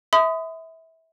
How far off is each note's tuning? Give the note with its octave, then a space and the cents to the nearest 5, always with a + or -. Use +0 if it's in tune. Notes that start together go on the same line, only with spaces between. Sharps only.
E5 -25 B5 +45 D#6 +0